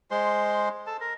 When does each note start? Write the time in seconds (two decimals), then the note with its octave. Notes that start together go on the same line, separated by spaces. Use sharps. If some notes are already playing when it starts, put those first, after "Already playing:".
0.11 G#3 C5 C6
0.87 A4 A5
1.00 A#4